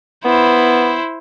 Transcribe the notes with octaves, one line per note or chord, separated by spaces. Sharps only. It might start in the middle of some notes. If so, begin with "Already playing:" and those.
B3 E4 C5